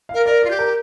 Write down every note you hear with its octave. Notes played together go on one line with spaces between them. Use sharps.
A#4 F5
A#4 D5
F4 D5
G4
A#4